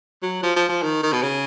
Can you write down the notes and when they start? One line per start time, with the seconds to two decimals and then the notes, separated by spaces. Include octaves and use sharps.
0.23 F#3
0.43 F3
0.56 F3
0.69 F3
0.83 D#3
1.03 D#3
1.13 B2
1.22 C#3